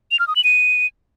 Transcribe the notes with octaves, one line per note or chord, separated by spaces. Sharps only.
F7
F6
D#6
F#7
D#7